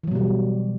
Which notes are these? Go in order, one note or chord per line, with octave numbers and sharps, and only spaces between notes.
B2 E3 F#3 G3